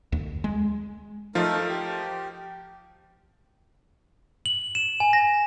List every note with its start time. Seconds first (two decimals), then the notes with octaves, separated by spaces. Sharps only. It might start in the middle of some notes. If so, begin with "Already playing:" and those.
0.12 D2
0.44 G#3
1.35 F3 A3 D#4 F4 A#4
1.69 G4
4.46 F#7
4.75 E7
5.00 G#5
5.13 A#6